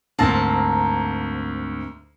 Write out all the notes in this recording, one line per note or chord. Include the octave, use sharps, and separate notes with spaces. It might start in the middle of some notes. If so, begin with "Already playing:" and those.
D2 G#2 A#3 C4 A5 A#5